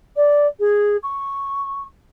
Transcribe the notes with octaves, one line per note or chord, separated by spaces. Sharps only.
D5
G#4
C#6